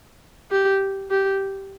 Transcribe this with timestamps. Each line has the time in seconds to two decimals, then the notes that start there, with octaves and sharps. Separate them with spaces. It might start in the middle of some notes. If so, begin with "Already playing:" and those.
0.51 G4
1.10 G4